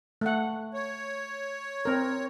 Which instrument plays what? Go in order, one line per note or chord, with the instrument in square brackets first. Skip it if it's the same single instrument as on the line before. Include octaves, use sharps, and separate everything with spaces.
[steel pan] A3 F#5
[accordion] C#5
[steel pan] C4 A#4